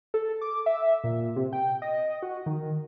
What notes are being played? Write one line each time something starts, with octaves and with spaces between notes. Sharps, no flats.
A4
D6
E5
A#2
C3
G5
D#5
F#4
D#3